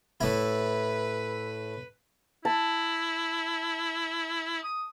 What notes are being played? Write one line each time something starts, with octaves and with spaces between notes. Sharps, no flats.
A2 E4 B4
E4 A5
D#6